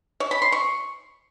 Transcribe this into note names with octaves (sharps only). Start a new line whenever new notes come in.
C#5
B5
C6
C#6